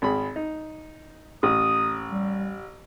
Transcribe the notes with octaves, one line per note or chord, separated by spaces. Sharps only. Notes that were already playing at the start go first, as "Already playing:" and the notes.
G#1 G#4 B5
D#4
A1 D#6
G3